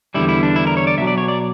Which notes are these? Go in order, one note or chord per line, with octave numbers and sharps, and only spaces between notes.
E2 D3 G3 E4
E4
D4
E4
A#4
C#5
D5
B1 B2 F#3 E5
D5
C#5
D5